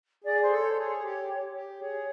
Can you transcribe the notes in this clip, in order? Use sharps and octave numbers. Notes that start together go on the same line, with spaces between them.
G#4 D5
C5
A4
C#5
C5
G#4 C#5
G4
G4
G#4 C#5